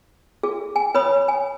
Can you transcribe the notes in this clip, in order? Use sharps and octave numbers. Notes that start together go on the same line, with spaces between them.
G#4
G#5
B4 C#5 B5 D#6
G#5